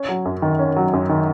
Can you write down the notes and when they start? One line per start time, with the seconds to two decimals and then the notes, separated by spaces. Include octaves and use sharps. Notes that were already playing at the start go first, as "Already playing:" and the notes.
Already playing: C#4
0.09 F#3
0.25 F#2
0.42 D#3
0.59 C#4
0.76 F#3
0.93 F#2
1.09 D#3